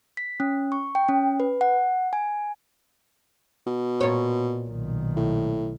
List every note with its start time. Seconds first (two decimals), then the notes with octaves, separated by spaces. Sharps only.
0.17 B6
0.40 C#4
0.72 C#6
0.95 G5
1.08 C#4
1.40 B4
1.61 F#5
2.13 G#5
3.67 B2
4.01 A#2 C#5
4.67 B1 D#3
5.17 A2